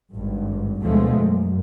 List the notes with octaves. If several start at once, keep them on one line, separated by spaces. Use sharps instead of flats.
G#1 G2
D2 B2 F3 G#3 A3
F#2